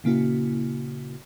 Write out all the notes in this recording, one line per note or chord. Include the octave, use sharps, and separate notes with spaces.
A#2 C#3 A#3 E4 F#4